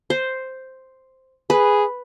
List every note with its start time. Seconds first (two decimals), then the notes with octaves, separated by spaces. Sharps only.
0.10 C5
1.50 G#4 B4